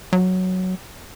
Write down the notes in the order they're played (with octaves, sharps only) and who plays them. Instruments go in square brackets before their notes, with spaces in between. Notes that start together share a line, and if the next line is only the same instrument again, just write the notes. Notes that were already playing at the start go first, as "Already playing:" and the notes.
[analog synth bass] F#3